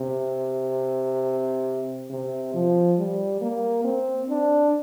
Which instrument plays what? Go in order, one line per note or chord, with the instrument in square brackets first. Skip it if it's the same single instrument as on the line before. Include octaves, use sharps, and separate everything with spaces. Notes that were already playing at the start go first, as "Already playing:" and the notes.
Already playing: [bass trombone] C3
C3
F3
G3
A#3
C4
D4